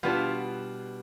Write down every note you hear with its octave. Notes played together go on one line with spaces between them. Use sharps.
B2 G3 B3 D4 F4